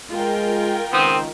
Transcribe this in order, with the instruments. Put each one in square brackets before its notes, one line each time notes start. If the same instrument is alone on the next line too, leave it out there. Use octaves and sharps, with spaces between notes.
[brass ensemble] G#3 [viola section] F4 A#4 G5
[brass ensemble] C#2 D#3 [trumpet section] B3 C4 D#6